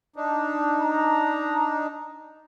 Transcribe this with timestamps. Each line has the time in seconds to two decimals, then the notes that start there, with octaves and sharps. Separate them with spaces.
0.16 D4 D#4
0.81 A#5